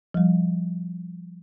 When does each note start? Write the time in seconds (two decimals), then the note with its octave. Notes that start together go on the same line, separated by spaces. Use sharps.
0.14 F3 G3